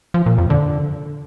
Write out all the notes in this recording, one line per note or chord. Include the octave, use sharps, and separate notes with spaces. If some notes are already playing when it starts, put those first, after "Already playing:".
F3
A#2
F2
D3